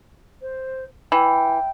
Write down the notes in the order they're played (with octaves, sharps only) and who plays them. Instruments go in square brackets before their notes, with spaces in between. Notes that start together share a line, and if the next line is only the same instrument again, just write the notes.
[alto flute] C5
[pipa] E3 [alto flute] G5